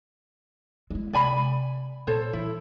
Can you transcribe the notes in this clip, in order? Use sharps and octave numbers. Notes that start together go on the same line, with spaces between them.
G#3 E4
C3 D5 G#5 B5
A#2 A4 C5 C#5
E3 E4